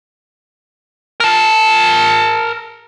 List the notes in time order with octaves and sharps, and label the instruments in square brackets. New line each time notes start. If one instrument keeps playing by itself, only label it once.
[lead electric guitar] A#4 A5